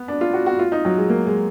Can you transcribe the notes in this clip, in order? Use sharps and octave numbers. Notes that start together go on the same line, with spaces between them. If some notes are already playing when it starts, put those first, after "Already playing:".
Already playing: B3
D4
F4
F#4
F#4
F4
D#4
F#3
G#3
A#3
G#3